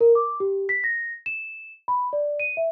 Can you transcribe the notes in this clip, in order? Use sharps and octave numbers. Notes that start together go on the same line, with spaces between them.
A#4
D6
G4
B6
A#6
E7
B5
D5
D#7
E5